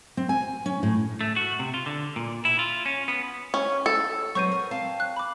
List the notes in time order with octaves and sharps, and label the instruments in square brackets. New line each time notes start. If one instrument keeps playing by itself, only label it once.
[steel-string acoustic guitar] C4
G#5
C#4
A2
[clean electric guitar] A3
F#4
C3
F4
D3
A#2
E4
F4
C#4
B3
[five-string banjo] C#4
A4
[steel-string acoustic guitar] F#3 B3 C4 [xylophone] C#6 G6 D#7
[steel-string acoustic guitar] A#4
C4 F5 A5
[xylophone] F#6
B5 D6